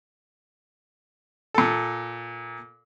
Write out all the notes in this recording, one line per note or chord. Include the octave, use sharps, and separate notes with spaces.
A#2 A4